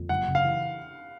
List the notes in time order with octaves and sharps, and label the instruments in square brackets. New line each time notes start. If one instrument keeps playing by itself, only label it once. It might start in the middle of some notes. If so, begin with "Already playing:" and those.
Already playing: [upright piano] F2
[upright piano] F#1 [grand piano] F#5
[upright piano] C#3
[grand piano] F5
[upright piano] E3